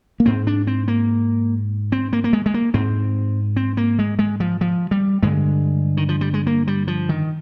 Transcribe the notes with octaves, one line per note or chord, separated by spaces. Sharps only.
A#3
G#2 C4
D4
C4
A#3
C4
A#3
A#3
G#3
G#3
A#3
G#2 C4
C4
A#3
G#3
G#3
F3
F3
G3
G2 D3 G#3
D#3
F3
G3
G#3
A#3
G3
F3
D#3